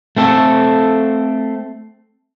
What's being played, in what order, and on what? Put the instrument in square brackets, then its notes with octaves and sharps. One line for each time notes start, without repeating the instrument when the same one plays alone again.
[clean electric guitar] A3 C4 A4